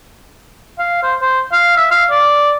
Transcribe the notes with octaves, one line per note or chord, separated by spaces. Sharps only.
F5
C5
C5
F5
E5
F5
D5